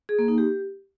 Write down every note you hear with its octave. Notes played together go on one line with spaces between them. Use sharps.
G#4
A#3
D#4
G4